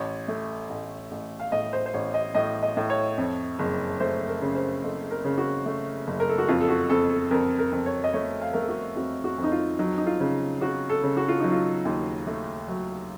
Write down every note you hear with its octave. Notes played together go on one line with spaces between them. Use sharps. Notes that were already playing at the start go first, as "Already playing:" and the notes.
Already playing: A1 C#5
A3
A1
A1
F5
A2 D#5
C5
C5
A1 C#5
D#5
A2 D#5
D#5
A2
C#5
F2
F#1
A3 C5
A#4
C#3
C5
F#1 A4
A#4
C#3
F#4
A3
F#1
A#4
A4
F#4
F2 F4
A4
F#4
F2 A4
A4
F2 A#4
A#4
F2
C#5
D#5
A3 C#5
F5
A3 A#4
A4
F#4
F2 F#4
F#4
F2
D#4
F4
F#3 D#4
D#4
F4
C#3
C#3 F#4
A4
C#3
F#4
F4
F#3 D#4
F4
D#2
A3
F#3